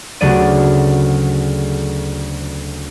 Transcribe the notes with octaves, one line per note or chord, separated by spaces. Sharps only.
D2 C#3 F#3 B3 D5 D#7